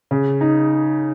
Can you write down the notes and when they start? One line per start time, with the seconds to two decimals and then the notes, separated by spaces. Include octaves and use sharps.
0.11 C#3
0.41 D#4